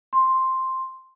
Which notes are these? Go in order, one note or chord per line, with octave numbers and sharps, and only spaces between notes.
C6